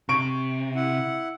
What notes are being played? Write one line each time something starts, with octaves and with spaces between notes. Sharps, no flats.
C3 C#6 D7
E4 F#5